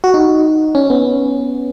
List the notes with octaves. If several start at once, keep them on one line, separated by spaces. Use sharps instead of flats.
F#4
D#4
C#4
B3